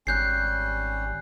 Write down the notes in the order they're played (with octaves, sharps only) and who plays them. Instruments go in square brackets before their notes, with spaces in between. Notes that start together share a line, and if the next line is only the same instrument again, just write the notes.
[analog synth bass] G#1 [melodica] G3 C#4 [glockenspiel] F#6 G6 C7